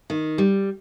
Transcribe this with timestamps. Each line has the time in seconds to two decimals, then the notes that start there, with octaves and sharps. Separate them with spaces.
0.10 D#3
0.38 G3